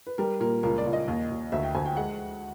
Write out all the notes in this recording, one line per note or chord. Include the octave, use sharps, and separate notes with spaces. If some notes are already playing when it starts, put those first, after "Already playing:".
B4
G3 A#4
A#2 A#4
C#2 A#4
D5
C#2
D#5
D#2
D#2
D2 E5
G5
D2 G#5
G5
G#3 F#5